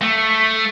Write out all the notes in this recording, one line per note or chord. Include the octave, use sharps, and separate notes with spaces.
A3